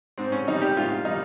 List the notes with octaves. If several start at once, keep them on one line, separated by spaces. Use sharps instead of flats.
G#2 C4
C#4
D#3 G3 D#4
G4
G#2 F4
D#3 G3 D#4